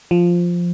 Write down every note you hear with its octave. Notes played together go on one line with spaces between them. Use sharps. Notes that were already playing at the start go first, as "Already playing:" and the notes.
F3